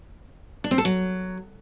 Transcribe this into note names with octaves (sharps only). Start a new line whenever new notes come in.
D4
C4
A4
F#3